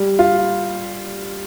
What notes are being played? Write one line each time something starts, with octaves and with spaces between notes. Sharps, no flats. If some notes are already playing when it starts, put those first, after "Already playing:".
Already playing: G3
F4